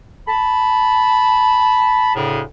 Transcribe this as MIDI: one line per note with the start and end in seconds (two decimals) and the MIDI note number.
0.28 2.14 81
0.28 2.14 83
2.15 2.41 38
2.15 2.41 45
2.15 2.41 49